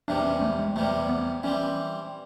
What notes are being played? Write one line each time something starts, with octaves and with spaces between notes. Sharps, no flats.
E2 C3 E3 G3 D4
C#4
A3
G#3
E2 C3 E3 G3 A3
B3
E3 G3 C4 C#4